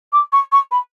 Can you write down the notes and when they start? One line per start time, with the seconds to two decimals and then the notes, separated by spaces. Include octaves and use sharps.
0.12 D6
0.32 C#6
0.52 C#6
0.71 B5